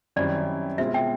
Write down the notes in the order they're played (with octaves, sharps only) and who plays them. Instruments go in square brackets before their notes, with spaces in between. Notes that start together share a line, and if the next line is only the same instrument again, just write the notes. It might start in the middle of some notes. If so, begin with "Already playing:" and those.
[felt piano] F#2 D#3 G3 C4 E4 [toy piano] D5
[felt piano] B2 G#3 C4 F4 [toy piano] E5
[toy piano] G5